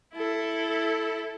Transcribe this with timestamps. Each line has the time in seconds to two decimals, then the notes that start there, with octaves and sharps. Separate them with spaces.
0.14 E4 A4